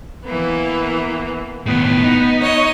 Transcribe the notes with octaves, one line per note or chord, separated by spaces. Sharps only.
E3 A#3 B3
D#2 A2 B3
D#4
C#5 D#5 D#6